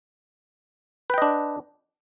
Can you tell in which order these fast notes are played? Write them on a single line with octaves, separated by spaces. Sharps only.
B4 G5 D#5 D4